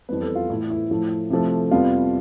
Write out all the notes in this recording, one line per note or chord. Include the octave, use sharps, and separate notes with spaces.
F2 E3 G3 B3 B4
A4
F4
A2 E3 A3 E4
E4
A2 F3 A3
C3 F3 A3
F2 C3 G3 B3 F4